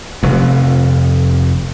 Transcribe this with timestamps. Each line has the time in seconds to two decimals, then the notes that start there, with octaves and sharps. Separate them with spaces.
0.23 F1 F2